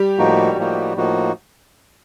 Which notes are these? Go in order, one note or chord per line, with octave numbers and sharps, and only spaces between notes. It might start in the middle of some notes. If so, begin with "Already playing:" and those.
Already playing: G3 G4
A2 F3 A#3 D#4 F#4
A2 F3 A#3 D#4 F#4
A2 F3 A#3 D#4 F#4